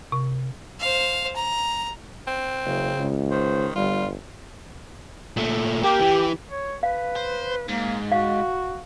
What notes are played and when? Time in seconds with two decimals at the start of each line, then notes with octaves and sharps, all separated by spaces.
0.12 C3
0.80 C5 F5
1.35 A#5
2.27 C4
2.65 F#1 C#3
2.99 C#2
3.31 D#3 C5
3.76 G1 G3 F4
5.37 A#2 A3
5.83 A#3 G4
6.00 E3
6.51 C#5
6.83 B4 F5
7.16 C5
7.69 G#2 A#3
8.12 F#4 F5